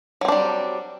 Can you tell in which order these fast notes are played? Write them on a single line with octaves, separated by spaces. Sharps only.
F#3 C4 D4 G3